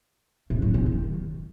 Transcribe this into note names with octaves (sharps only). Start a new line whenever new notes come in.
A2
F#3
A2
D#3